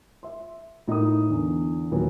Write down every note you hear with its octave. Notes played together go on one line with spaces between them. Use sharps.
E5 C6
A2 D#4 A#4 D#5 D#6
E2 D3
D#2 A#2 E3 F#3 B4 C#5